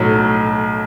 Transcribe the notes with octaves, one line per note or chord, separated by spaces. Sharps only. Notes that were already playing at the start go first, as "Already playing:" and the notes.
Already playing: B1 A2 F#3